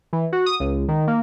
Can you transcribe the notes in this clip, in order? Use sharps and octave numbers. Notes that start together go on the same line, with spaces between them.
E3
F#4
D#6
C#2
D#3
A#3